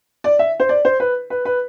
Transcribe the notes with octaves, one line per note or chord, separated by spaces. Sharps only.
D5
E5
C5
D5
C5
B4
B4
B4